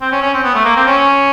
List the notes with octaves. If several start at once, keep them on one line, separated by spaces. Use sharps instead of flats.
C4
C#4
C#4
C4
B3
A3
A#3
C4
C#4